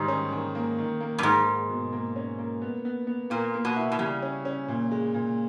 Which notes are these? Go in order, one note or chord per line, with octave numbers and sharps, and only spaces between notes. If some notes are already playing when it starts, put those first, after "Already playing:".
Already playing: G#2 D#3 G3
C#4
D#3
A#3
D#3
A#3
G2
G#2 G#3
G#3
B2
A#3
C#4
A#3
B3
B3
B3
A#2 A#3
A#3
B2
E4
B2
C#3 G3
C#4
C#4
A#2
G#3
A#2